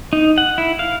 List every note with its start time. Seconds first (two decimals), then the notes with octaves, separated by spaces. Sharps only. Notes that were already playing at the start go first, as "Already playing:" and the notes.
0.13 D#4
0.38 F#5
0.58 E4
0.79 F5